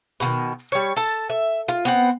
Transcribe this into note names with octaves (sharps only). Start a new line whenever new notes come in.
B2 D3 D#3
G3 C#5
A4 A5
E5
F4
B3 C4 F#5